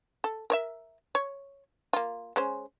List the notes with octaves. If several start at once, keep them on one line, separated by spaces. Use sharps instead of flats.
A4
A#4 C#5 E5
C#5
A#3 F4
G#3 C#4 C5